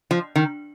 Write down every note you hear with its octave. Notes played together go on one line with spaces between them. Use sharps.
F3
D#3